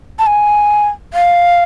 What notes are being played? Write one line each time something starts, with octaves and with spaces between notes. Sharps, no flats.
A5
G#5
F5